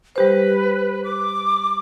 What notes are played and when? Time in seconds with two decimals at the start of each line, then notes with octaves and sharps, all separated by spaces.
0.16 G3 G4 B4 C5
1.04 D6